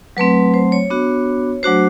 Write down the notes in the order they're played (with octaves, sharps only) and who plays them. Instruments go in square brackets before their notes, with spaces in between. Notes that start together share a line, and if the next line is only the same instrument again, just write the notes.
[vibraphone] F#3 A3 C4 B4
C5
C#5
B3 D4 F#4
F#3 A3 D4 F#4 C5